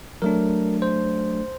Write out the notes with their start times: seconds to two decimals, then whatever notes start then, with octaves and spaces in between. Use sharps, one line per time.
0.22 F#3 A3 D4 A#4
0.82 C5